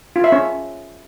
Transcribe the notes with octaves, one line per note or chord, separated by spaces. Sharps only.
F4
E5
C#4